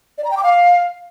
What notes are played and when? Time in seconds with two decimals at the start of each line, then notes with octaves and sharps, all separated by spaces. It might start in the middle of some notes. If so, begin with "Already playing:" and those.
0.18 D5
0.24 A#5
0.31 G5
0.37 D6
0.43 F5